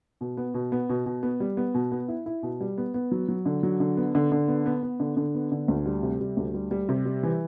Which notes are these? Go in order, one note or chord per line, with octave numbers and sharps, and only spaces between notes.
B2
B3
B2
B3
B2
B2
B3
G3
B3
B2
B3
E4
E4
B2
G3
B3
B3
F#3
F#3
D3
F#3
D3
B3
D3
D3
B3
B3
B3
D3
D3
B3
D3
D2
G3
C3
G3
D2
G3
G3
C3
G3
E3